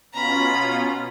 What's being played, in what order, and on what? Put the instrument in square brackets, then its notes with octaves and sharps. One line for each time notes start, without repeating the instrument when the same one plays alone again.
[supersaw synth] B2 C#4 F4 [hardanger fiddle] A#5 B5